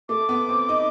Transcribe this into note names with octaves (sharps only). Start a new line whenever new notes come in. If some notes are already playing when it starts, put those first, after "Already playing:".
A3 D6
B3
C4
D#4